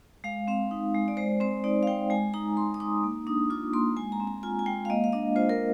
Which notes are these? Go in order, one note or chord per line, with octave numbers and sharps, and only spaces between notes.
G#3 F5
C4 F5
D#4
G#3
D5
G#3 C5
C4 C5
D#4 D5
F5
G#3 G5
G#3 G#5
D#4 A#5
G#3 C6
D#6
D#4 D6
A#3
D4 D#6
F4 D6
A#3 C6
G#3 G#5
A#5
C4
A#5
F4 G#5
G#5
G#3 G5
F5
A#3 D#5
F5
D4 D#5
F4 C5
A#4